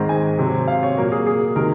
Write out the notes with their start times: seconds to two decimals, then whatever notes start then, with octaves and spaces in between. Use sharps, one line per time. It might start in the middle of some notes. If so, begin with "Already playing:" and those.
Already playing: G#2 D#3 G#3 C4 A#5
0.09 G#5
0.39 C3 F#3 C4
0.68 F5
0.83 C#5
0.97 A#2 F#3 A#3 A#4
1.12 G#4
1.27 G#4
1.56 C3 D#3 G#3 A#4